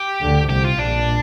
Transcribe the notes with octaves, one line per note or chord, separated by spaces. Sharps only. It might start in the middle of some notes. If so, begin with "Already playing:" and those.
Already playing: G4
D2 D3
C2 C3 G4
F4
A#1 A#2 D4